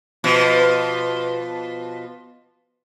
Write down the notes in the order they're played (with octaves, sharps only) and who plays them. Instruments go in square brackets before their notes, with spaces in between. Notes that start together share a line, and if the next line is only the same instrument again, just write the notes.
[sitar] B2 F3